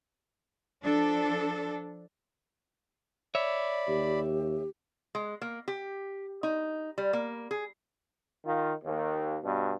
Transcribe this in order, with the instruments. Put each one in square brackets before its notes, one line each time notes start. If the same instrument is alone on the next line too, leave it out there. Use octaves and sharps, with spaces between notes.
[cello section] F3 D4 A4
[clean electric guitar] C#5 E5 [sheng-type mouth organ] D5 B5
[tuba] D#2 [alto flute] G4
[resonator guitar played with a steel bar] G#3
A#3
G4
D#4
G3
A#3
G#4
[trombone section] D#3 F4
D#2
G2 B2